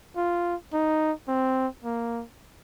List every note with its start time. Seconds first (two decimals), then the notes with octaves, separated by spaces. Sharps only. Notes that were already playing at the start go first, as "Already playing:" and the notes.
0.16 F4
0.73 D#4
1.28 C4
1.84 A#3